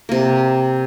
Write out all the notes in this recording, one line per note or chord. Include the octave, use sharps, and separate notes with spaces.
C3 A#3